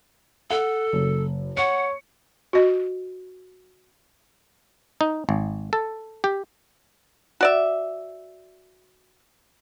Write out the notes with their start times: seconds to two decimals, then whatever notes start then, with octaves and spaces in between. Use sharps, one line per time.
0.50 A4 F#5
0.93 F#1
1.57 C#5 F#5 C#7
2.53 F#4 D#5
5.01 D#4
5.29 G#1
5.73 A4
6.24 G4
7.41 F#4 D5 E5